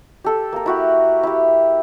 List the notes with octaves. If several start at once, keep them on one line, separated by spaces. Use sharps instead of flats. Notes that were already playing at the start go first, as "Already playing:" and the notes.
G4 A4
A#3 A#4
E4 F#4 G4
E4 G4